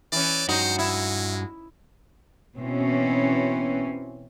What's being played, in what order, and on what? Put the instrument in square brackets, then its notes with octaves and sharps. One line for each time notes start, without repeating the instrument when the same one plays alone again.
[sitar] E3 C#4 [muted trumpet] D5
[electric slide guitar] G2 F#4 [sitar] D#4 [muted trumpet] C5
[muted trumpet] G#3 [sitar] E4
[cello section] B2 E3 C4 C#4